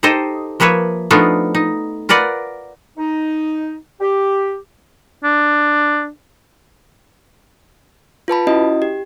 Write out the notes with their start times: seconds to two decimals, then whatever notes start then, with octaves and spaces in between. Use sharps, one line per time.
0.03 D#4 G4 A4 C5 D#5
0.60 F3 A#3 B4 C#5 E5
1.11 F3 A3 B3 D4 D#4 F4
1.55 D#4
2.09 F4 A#4 B4 D5 F#5
2.98 D#4
4.01 G4
5.24 D4
8.28 F4 B4 A5 B5
8.47 C#4 E4 F#4 D#5
8.82 G4